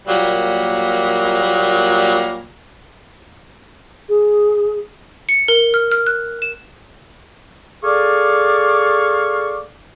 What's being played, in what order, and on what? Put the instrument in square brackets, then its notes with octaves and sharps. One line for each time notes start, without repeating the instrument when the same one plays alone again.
[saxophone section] A#2 F#3 G3 A#3
[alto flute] G#4
[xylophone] C#7
A#4
F6
F6
F#6
E7
[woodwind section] G#4 A4 D5 F5 C#6 D6